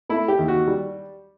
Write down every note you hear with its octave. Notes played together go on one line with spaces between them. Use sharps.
A3 E4
G4
D#2
F#4
G3